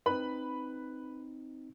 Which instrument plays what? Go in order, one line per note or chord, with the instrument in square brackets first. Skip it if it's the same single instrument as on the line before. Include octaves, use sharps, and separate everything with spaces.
[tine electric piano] C4 D#4 [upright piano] B4 B5